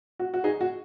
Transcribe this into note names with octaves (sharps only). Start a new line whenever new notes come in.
F#4
F#4
D#4 G#4
F#4